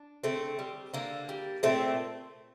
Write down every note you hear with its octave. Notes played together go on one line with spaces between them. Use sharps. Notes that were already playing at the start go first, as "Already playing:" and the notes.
Already playing: D4
D3 A3 C4
G3
D3 A#3
G3
A#2 A3 C4